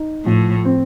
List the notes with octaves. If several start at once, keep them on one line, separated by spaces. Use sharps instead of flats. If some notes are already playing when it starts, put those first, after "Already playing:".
Already playing: D#4
A2 F3
C4